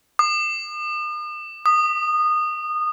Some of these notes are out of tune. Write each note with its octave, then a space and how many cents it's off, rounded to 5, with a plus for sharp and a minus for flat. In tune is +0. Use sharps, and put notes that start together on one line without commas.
D#6 -45
D#6 -20